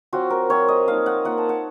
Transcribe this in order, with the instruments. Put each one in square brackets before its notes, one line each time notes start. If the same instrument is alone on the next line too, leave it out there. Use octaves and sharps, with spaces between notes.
[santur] F#3 C4 F4 F#4
A#4
F#3 C4 F4 C#5
D#5
F3 A#3 D#4 F5
F#5
A#3 F4 F#5
A5
F#5